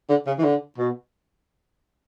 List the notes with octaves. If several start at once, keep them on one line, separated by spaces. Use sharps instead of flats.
D3
C#3
E3
D3
B2